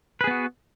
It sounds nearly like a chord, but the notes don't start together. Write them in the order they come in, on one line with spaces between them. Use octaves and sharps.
B4 G#4 B3 F#4